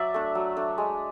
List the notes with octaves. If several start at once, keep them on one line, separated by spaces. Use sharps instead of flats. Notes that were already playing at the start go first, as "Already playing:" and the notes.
Already playing: F#3 D5 E5
A3 D4
F#3
A3 D4
G#3